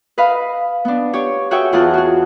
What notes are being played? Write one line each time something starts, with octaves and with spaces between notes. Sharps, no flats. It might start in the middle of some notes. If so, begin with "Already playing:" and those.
B4 D#5 F5 B5
B3 D4
G4 C#5
F#4 G#4 C#5 E5 G5 G#5
E2 F4 G#4 A5 F#6
F#4 G#4